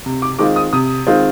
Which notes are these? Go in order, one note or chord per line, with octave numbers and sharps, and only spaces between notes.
C3
D6
D#3 G#3 C4 F4 D6
D#6
C3 D#6
D#3 G#3 C4 F4